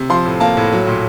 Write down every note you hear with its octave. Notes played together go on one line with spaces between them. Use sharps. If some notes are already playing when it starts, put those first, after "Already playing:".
Already playing: C3
F3 C6
A2
A#3 A5
A2
F#3
A#2